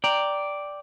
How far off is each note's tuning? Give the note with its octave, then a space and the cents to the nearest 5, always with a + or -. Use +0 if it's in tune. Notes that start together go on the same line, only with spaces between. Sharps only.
D5 +0 G5 +0 A#5 +0